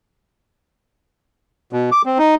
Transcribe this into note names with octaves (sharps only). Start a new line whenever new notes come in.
B2
D6
C4
D#4